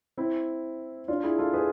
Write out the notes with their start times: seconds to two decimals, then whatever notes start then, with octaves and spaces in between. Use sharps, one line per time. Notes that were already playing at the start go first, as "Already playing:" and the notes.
0.18 C4 E4
1.08 D4 F4
1.23 E4 G#4
1.38 F4 A4
1.53 G#4 B4